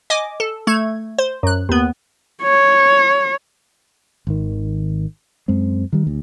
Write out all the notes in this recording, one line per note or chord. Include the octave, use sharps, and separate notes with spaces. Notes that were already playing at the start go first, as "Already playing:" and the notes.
D#5 G#5 D6
A4
A3 G#6
C5
F#2 F#6
D#2 B3
C#5
G#1 D#3
F#2 G#3 C4
D#3 G3
D2